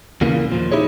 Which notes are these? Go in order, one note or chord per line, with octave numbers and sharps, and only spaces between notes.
E2 A#2 C#3 E3 A#3
D#2 A#2 F3
D#4 E4 G4 G#4 C#5